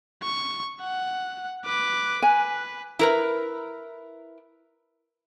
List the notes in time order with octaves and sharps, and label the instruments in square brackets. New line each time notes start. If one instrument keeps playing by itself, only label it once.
[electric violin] C#6
F#5
B4 D6
[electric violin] B4 [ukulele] G#5
[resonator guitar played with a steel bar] E4 A#4 B4